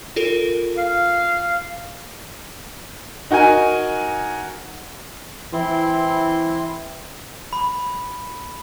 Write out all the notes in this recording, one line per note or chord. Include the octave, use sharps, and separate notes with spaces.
F4 A4 A#4
F5
D#4 F#4 A#4 G#5
E3 C4 E4 C6
B5